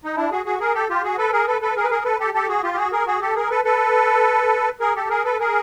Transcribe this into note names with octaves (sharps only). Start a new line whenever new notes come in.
D#4
D4 E4
F#4 G#4
F#4 G#4
G#4 A#4
G4 A4
F4 G4
F#4 G#4
A4 B4
G#4 A#4
A4 B4
A4 B4
G#4 A#4
B4
G#4 A#4
A4 B4
G4 A4
G4 A4
F#4 G#4
F4 G4
G4
F#4 G#4
G#4 A#4
F#4 G#4
G4 A4
G#4 A#4
A4 B4
A4 B4
G#4 A#4
G4 A4
G#4 A#4
A4 B4
G#4 A#4